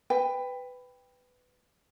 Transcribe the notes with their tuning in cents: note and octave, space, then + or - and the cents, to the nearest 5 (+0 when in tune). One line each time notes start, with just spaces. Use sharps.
B4 +15 G5 +15